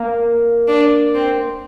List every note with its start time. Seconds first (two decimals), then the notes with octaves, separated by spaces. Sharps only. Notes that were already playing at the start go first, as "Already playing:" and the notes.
Already playing: A#3
0.68 D4
1.14 C4